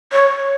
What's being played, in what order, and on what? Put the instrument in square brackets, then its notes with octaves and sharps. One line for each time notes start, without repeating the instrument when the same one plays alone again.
[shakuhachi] C#5